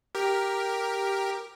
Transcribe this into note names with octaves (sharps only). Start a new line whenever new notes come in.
G4 A#4